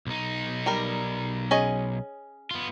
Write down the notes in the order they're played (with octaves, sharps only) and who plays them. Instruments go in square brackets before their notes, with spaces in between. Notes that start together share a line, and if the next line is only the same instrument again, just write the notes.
[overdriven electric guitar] B1 D#4
[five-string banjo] G3 A#4
C#4 G#4 D#5
[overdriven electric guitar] B3 F4